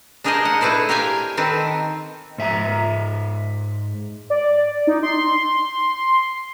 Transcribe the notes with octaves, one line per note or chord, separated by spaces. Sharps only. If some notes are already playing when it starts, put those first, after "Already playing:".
D4 D#4 G#4 A#4 C5 D#5
F#5
A3 D4 E4 B4 C5 D5
G4 A#4 F5 G5 G#5
D#3 C4 A4 B4
G#2 E5 G#5 A#5
D5
D#4
C6